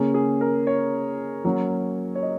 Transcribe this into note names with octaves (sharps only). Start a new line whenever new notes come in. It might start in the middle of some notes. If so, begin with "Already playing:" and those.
Already playing: C#3 A#3 C#4 G#4
G#4
A#4
C#5
F#3 A#3 C#4 C#5
C#5
D#5